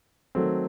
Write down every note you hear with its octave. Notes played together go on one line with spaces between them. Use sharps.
D#3 F#3 A3 C4